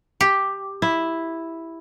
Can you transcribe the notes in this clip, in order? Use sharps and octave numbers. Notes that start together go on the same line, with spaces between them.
G4
E4